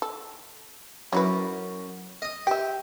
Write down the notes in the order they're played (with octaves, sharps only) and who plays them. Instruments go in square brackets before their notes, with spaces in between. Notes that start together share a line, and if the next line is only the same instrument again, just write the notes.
[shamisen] A4
[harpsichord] F#2 [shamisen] C#4 E4 B4
[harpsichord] D#5 D#6
[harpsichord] G4 [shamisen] E5 G5